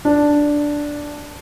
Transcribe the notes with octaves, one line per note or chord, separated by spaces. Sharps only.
D4